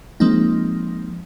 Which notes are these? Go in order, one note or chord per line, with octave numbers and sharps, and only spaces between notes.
F3 G#3 A#3 C4 D#4